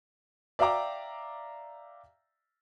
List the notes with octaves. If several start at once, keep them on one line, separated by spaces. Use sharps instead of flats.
D5 E5 F5 G5 A#5 D6